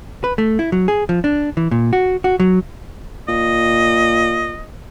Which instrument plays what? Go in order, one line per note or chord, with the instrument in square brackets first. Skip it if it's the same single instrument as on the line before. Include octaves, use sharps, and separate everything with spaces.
[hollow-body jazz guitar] B4
A3
E4
F#3
G#4
F3
D4
E3
A#2
F#4
F#4
F#3
[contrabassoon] A#2 [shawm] D#5